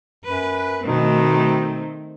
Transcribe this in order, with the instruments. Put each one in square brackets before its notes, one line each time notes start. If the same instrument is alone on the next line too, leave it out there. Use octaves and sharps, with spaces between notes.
[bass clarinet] F#2 [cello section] B4
[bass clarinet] B2 [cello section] D#3 A3 C4